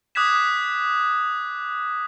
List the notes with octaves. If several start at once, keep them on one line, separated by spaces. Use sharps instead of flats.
D6 D#6 F#6 G#6 B6 E7